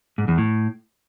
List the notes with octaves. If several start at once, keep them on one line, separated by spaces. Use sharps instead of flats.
G#2
E2
A2